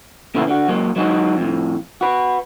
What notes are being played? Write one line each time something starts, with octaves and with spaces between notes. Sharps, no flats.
A#2 C#3 E3 A3 B3 E4
D3 F#4
F#3 G#3 A#3
F#3 G#3 B3 D#4 F#4 G#4
F2 A2
F#4 B4